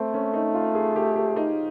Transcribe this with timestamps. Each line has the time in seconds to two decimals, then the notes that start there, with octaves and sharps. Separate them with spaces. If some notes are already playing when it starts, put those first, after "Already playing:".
Already playing: A3 C4
0.14 C#4
0.34 D#4
0.54 F4
0.75 G#4
0.96 G4
1.16 G4
1.36 D#4